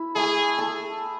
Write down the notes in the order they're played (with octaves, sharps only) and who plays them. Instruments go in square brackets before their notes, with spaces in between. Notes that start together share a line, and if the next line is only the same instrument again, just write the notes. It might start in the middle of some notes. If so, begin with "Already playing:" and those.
Already playing: [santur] E4 E5
[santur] A3 [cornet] G#4
[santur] A4